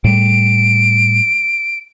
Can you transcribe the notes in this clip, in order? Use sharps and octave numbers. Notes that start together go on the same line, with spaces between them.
A2 G3 D7